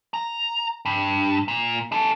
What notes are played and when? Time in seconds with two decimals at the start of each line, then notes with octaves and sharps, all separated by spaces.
0.14 A#5
0.85 G2
1.48 A#2
1.92 D#4 A4